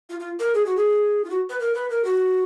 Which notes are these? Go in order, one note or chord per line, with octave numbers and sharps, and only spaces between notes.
F4
F4
A#4
G#4
F#4
G#4
F4
F#4
B4
A#4
B4
A#4
F#4